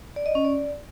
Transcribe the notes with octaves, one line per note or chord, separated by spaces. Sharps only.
D5
D#5
C#4
D5